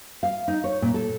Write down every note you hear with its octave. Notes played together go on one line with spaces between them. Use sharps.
F5
D#4
C#5
A#2
A4